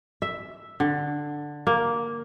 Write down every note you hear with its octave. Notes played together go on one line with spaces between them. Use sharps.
E5
D3
A#3